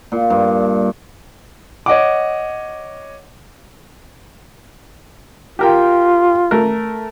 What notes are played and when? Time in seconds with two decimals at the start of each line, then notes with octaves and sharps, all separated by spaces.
0.12 A#2
0.30 G2
1.86 C#5 D#5 F#5 D6
5.59 F4 G4 A#4 G5
6.51 A3 A#4